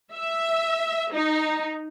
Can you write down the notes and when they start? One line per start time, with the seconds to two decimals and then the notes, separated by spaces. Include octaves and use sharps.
0.13 E5
1.13 D#4